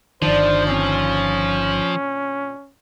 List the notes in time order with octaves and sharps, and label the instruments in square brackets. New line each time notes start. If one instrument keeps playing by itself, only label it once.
[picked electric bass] G1 D#3 [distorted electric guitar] F3 [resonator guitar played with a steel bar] D4 [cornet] C5
[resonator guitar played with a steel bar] A#2 D3 C4 [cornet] C#4